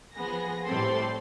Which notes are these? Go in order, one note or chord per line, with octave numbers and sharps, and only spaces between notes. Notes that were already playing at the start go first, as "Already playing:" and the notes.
F3 B3 G#4 A#6
A2 G3 C4 A4 C6